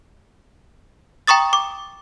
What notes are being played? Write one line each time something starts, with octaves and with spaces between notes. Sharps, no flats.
G5 A#5 C#6 D#6 A6
D6